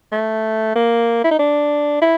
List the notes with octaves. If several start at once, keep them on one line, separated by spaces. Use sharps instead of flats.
A3
A#3
E4
D#4
D4
E4